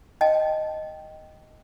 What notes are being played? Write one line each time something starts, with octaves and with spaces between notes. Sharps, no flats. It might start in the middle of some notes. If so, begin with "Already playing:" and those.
D#5 G5 A5